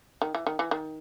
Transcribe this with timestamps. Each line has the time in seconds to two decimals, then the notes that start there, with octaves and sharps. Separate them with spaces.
0.22 D#3
0.35 E3
0.47 D#3
0.59 E3
0.71 D#3